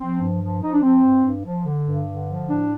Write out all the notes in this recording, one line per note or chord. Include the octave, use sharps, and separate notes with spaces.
F3 C4
G2
F3
F3 D#4
D4
F3 C4
G2
G2
F3
D3
G2
D3
F3
A2 D4